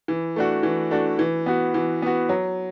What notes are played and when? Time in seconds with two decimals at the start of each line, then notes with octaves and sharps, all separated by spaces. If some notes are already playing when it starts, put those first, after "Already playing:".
0.08 E3
0.36 A3 D4 F#4
0.63 E3
0.91 A3 D4 F#4
1.19 E3
1.46 B3 F#4
1.74 E3
2.02 B3 F#4
2.29 F#3